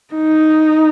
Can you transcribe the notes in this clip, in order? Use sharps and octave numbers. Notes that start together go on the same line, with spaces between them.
D#4